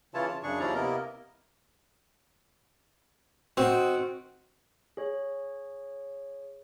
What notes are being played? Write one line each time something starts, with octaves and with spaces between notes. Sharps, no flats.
C#3 E3 E4 F4 C#5 A5
A5
F#2 C#3 D4 G#4 C#6
D#2 F3 C#4 E4 D5 A#5
C3 A#3 B3 E4 A#4 D#5
D#3 C4 F#4
G#4 C#5